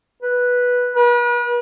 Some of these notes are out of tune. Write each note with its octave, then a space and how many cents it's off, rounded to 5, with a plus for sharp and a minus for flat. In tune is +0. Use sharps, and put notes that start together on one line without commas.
B4 -5
B4 -40